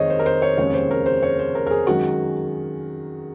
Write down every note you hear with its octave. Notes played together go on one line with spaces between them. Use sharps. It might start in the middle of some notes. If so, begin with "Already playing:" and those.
Already playing: F1 F2 C3 D#3 G#3 C5 C#5 D#5
C5
A#4
C5
C#5
F1 D#2 C#3 G#3 C#5
C5
A#4
C5
C#5
C5
A#4
A#4
G#4
F#2 D#3 G#3 F#4